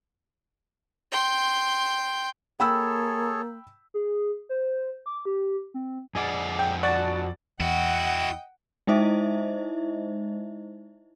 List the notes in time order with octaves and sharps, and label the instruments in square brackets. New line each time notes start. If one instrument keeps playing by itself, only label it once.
[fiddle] G5 C6
[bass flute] A#3 [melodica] G#4 A4 C#5 [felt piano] G5 B5 E6
[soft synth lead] G#4
C5
D6
G4
C4
[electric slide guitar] F2 D#5 F#5 [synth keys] G#4 D5
[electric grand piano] G5
[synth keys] F#4 A5 [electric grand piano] D5 A6
[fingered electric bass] E2 [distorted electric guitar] E4 F#4 [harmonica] D#5 G5 [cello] F#5
[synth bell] G#3 D#4 E4 C5 D#5 E5